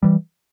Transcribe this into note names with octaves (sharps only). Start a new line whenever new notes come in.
E3 G3